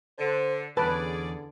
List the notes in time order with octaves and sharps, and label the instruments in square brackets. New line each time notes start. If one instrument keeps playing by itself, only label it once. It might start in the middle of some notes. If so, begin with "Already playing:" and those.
[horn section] D3 [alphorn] C5
[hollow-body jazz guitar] E2 F3 A5 [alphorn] D3 [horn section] C#4 G#4 D5 [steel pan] B4